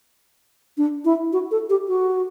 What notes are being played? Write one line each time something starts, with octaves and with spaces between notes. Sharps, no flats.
D4
E4
F#4
A4
G4
F#4